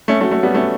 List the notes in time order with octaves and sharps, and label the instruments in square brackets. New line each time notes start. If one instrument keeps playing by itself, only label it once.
[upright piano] A3 C#4
F#3 A3
F#3 A3
G3 B3
A3 C#4